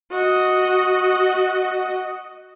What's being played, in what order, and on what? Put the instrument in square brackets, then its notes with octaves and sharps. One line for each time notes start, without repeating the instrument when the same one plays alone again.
[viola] F#4 D#5